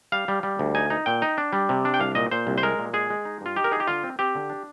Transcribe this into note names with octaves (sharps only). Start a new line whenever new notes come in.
G3 F5
G3
G3
D2
D#4 G#5
D#4
A#2 G5
D#4
D4
G3
C3
D4
G5
C2 F5
A#2 D#5
A#2 C5
C2
C5
G#3 A#4
A#2
G#3 G#4
G#3
D#4
G2 F4
D#4 G4
A#4
D#4 G#4
G4
D3 F4
C4
C4 G4
D3
D4